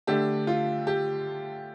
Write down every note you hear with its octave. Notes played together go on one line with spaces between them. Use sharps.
D3 A3 D4 G4
F4
G4